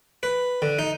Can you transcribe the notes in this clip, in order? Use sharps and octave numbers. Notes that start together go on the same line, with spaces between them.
B4
D3
D#4